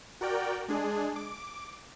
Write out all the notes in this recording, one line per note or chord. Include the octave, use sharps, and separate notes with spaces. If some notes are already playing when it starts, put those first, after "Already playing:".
F#4 A#4 D5 G5
G#3 D4 G#4
D6